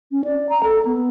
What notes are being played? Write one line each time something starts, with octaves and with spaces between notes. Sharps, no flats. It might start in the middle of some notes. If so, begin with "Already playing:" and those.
C#4
D5
A#5
A4
B3